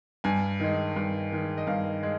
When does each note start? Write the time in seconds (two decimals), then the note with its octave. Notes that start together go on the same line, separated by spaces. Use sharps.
0.24 G2 G#5
0.60 D#3 G#3
0.96 G2
1.32 D#3 G#3
1.57 D#5
1.67 G2 F5
2.03 G#3